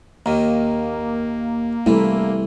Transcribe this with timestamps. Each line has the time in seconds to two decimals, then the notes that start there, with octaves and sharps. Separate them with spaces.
0.26 D#2 D#3 A#3
1.86 C2 E3 A3 E4